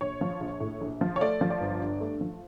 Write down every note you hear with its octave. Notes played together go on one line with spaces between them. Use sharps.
A#1 C#5
F3
A#1
A2
A#1
F3
C#5
A3 D5
F3
D5
G1
G2
A3
F3